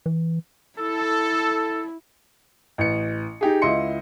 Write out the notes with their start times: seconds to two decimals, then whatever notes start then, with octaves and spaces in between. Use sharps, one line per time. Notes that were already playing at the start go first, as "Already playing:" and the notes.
0.06 E3
0.79 E4 A4
2.78 A1 C#7
3.41 D#4 G4 G#4
3.62 C#2 E4 D#5 C6 C#7